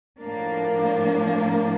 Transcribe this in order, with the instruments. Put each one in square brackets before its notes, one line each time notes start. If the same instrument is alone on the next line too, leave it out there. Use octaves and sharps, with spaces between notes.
[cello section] A2 F3 A#3 D4